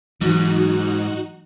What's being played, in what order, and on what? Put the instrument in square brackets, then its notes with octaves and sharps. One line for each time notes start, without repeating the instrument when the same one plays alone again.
[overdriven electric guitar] G#2 [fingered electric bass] E3 F#3 [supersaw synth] D#4 F#4 F#6